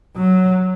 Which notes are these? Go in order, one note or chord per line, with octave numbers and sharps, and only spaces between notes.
F#3